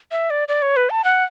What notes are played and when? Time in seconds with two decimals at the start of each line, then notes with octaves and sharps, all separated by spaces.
0.11 E5
0.30 D5
0.48 D5
0.62 C#5
0.76 B4
0.90 A5
1.04 F#5